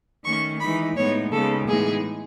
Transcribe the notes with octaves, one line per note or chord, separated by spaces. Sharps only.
D#3 A3 C#4 C#6
E3 G#3 D#4 B5
A2 G#3 B3 D#4 C#5
C#3 G#3 B3 D#4 A4
A2 E3 G#3 B3 D#4 G#4